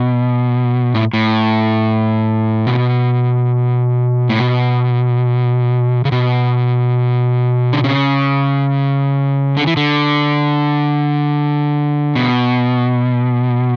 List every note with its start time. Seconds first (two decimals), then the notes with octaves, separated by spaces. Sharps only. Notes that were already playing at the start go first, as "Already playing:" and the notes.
Already playing: B2
0.94 A2
1.13 A2
2.67 B2
4.29 A2
4.39 B2
6.05 C#3
6.12 B2
7.73 D3
7.84 C#3
9.57 D3
9.67 E3
9.77 D3
12.16 B2